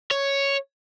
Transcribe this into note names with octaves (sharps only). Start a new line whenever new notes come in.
C#5